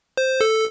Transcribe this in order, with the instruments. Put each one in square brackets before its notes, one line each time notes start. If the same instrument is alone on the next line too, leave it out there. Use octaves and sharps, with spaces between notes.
[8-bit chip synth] C5
A4